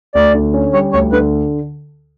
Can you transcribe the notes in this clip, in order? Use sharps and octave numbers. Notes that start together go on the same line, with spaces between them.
D2 D5
D3
C#4
G3 C#5
D2 C#5
D3 B4